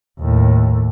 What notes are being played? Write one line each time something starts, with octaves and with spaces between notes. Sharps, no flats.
D#2 A2